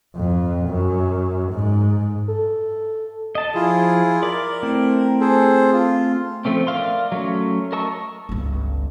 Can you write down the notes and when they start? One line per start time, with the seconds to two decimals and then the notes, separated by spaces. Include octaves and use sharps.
0.16 F2
0.69 F#2
1.52 G#2
2.28 A4
3.35 D#5 A5
3.55 F3 E4 F4 G#4
4.23 A#4 D5 B5 D6
4.63 A3 C4 E4
5.21 G#4 A4 C5
5.73 F4
6.45 F3 A3 C4 C#4
6.67 A#4 D5 E5 F5 C6
7.12 F#3 A3 C#4
7.72 A#4 D#5 A5 C#6 E6
8.29 G1 C#2